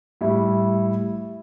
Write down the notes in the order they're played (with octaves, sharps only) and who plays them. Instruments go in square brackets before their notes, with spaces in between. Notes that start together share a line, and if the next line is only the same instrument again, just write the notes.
[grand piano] A2 G3 E4